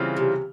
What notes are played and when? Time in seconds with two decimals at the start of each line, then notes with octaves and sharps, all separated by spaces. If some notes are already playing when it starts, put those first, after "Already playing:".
Already playing: C#3 E3 G3 C4 F4
0.17 C3